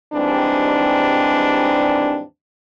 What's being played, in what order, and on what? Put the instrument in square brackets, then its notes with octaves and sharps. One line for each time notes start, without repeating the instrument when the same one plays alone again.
[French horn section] D#2 G#2 E3 G3 C4 D4